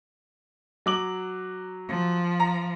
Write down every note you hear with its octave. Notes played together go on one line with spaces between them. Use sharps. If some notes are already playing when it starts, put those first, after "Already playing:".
F#3 D6 F#7
F3
A#5